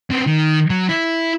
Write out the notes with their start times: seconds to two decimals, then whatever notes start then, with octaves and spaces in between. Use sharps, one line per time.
0.11 B3 C4
0.27 D#3
0.70 F#3
0.89 E4